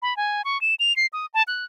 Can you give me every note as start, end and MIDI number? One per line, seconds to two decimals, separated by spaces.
0.02 0.16 83
0.17 0.42 80
0.45 0.60 85
0.61 0.75 100
0.80 0.95 101
0.96 1.06 96
1.13 1.26 87
1.34 1.43 81
1.47 1.65 90